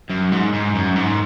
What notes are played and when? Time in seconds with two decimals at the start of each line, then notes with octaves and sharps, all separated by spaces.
0.10 F#2
0.32 G#2
0.53 G#2
0.75 F#2
0.96 G#2